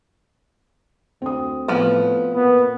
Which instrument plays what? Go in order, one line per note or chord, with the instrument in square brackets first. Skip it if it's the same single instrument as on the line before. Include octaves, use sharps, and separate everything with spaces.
[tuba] D2 [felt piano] C4 D#6
[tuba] A2 [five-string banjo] F3 B3
[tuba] A#2 [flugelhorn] B3